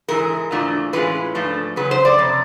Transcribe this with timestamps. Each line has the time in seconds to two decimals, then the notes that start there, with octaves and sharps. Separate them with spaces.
0.08 G#2 E3 G#3 A#4
0.51 G#2 E3 A3 D4 F4
0.93 A2 E3 G#3 C#4 F4 B4
1.35 G#2 F3 A3 D4
1.76 E2 C#3 F#3 B4
1.91 C5
2.05 D5
2.18 F2 C3